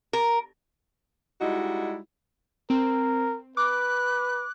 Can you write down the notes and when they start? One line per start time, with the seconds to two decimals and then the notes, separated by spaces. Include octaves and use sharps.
0.13 A#4
1.41 G3 G#3 D#4 E4 F#4
2.70 C4 A#4
3.57 B4 D6 F#6